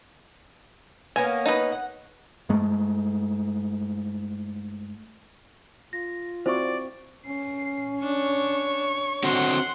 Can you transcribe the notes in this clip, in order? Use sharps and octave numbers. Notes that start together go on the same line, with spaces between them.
A#3 B3 C#4 G#5
D#4 B4
F#5
G2 G#3 A3
F4 A#6
C4 E4 F#4 C5 D5 C#6
C#4 C7
D4 C#5 C#6
D3 C4 F#4 F#5 C6